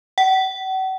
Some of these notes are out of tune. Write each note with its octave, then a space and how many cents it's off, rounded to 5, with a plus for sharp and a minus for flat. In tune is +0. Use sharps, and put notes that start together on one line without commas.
F#5 +40